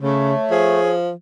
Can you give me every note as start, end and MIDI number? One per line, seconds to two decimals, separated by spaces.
0.01 0.34 49
0.01 0.80 57
0.01 0.90 73
0.51 1.11 53
0.51 0.94 68